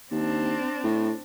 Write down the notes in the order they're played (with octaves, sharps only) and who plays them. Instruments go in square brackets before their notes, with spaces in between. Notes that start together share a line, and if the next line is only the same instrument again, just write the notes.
[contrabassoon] D#2 [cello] C4 D4
[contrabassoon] A2